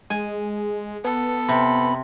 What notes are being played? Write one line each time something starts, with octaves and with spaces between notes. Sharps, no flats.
G#3 G#5
B3 A4
C3 B5